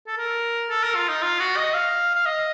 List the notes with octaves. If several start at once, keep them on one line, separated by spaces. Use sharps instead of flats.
A4
A#4
A4
A#4
F4
D#4
F4
F#4
D#5
F5
F5
D#5